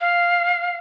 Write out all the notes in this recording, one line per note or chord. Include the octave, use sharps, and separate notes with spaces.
F5